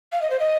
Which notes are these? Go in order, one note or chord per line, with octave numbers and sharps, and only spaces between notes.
F5
D#5
C5
D#5